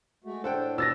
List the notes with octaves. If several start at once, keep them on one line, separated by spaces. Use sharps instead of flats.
G#3 A3 F#4
A2 D4 A4 C5 F#5 G5
B2 E6 A6 A#6